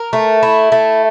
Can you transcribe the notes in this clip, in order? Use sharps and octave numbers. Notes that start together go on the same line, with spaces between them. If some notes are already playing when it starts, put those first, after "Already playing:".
Already playing: A#4
A3
E4
A3